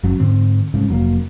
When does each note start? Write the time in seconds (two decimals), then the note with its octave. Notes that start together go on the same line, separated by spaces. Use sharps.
0.04 F#1 C#3 F#3 C#4
0.20 G#2 D3 C4
0.74 C2 G#2 C#3
0.88 F1 F#3 A#3